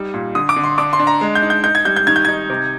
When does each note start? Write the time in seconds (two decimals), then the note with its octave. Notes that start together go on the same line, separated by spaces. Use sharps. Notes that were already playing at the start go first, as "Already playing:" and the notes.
Already playing: G3 D#4
0.14 A#2
0.35 D3 D#6
0.49 D6
0.56 D3
0.64 C6
0.78 D4 D6
0.93 C6
0.99 D4
1.07 A#5
1.21 G#3
1.35 G6
1.42 D#4
1.50 G6
1.63 D#4 G6
1.75 G#6
1.85 G3 G6
1.96 G6
2.07 D#3 G#6
2.16 G6
2.25 D#4 G#6
2.50 C3